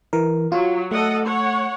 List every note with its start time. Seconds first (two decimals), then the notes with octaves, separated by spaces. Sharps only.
0.13 E3 A#4
0.52 F#3 F4
0.91 A3 A4 D#5 F#5
1.25 C#5 F#5